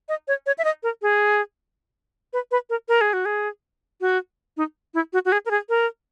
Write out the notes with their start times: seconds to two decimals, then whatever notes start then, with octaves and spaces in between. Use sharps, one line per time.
0.09 D#5
0.28 C#5
0.46 C#5
0.58 E5
0.64 D#5
0.83 A#4
1.02 G#4
2.33 B4
2.51 B4
2.70 A#4
2.88 A#4
3.01 G#4
3.13 F#4
3.25 G#4
4.01 F#4
4.57 D#4
4.94 E4
5.13 F#4
5.25 F#4
5.32 G#4
5.46 A#4
5.51 G#4
5.69 A#4